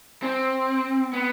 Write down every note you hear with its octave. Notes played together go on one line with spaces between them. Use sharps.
C4
B3